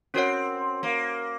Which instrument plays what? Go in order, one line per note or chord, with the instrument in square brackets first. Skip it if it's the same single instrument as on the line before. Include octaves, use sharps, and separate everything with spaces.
[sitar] C4 [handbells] C#4 F#4 A#4 C#5 F#5
[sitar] A#3